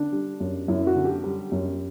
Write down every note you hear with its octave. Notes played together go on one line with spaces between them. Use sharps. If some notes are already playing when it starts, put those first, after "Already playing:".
Already playing: D3 D4
G3
F#2
F#2 E4
F#4
D3
G4
G3
F#2